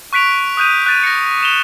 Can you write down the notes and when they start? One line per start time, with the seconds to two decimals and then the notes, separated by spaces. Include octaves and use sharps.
0.13 C#6 F#6 B6 D7 F7
0.57 D#6 F#6 G6 D#7
0.86 F#6 A6 D#7
1.03 A#6 C#7
1.43 E7 F7 G7